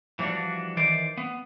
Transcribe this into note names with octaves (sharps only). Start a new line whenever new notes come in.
E3 F3 G3 D4 F#4
D#3 E3 C5 D5
B3